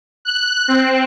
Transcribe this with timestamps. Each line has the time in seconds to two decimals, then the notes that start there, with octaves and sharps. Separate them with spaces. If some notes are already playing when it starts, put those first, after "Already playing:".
0.25 F#6
0.68 C4